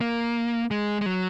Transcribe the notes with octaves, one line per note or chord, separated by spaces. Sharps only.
A#3
G#3
G#3
F#3